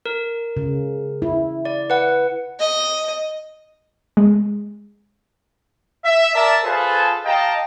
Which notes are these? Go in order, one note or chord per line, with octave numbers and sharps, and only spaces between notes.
A#4
C#3
E4
D5
B4 F#5
D#5
G#3
E5
A#4 D5 E5 A5
F4 G#4 A4 B4 C5 A5
G4 D#5 F5 G5 A5 A#5